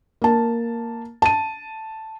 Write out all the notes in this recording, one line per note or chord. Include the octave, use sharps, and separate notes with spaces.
A#3 A5
A5 D#7